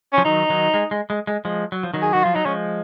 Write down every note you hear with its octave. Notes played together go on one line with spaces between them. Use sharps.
F3 C#4
D#3 F#3 D#4
D#3 F#3
G#3
G#3
G#3
G#3
F3 G#3
F#3
F3
D#3 F#3
G#4
D#3 F#4
F3 F4
F#3 D#4
F3 G#3 C#4